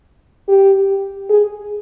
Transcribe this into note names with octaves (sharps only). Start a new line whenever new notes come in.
G4
G#4